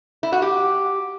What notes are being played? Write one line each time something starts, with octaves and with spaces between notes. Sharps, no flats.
E4
F#4
G4